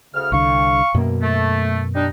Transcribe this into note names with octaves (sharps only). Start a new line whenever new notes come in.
D2 C#3 F6
C2 D3 F5 C#6
F#2 B2 A#3
A3
G3 D4 D#4